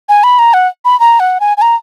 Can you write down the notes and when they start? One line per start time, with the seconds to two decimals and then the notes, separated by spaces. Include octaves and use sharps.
0.09 G#5
0.24 B5
0.39 A#5
0.54 F#5
0.85 B5
1.00 A#5
1.20 F#5
1.40 G#5
1.57 G#5
1.62 A#5